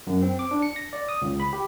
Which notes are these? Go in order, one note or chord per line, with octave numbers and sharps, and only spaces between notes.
F#2
C4
D6
D4
C#7
A#6
D5
D#6
C#2
B5
G4